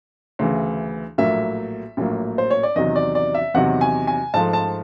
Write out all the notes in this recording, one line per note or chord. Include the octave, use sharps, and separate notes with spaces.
D2 C#3 E3
A#1 A2 F#3 A#3 E5
A#1 A2 F#3 A#3
C5
C#5
D5
E2 C3 D#3 F#3 D#5
D5
D5
E5
E2 C3 D#3 F#3 F#5
G#5
G#5
G#2 F3 A3 A5
A5